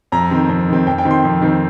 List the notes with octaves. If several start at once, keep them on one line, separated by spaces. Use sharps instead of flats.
F2 A#5
D#3 C4
F2
D#3 C4
F2 G5
G5
D#3 C4
C6
F2
D#3 C4